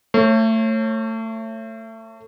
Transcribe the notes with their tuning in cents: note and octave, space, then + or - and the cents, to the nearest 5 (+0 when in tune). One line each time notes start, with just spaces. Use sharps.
A3 +25 C#5 -25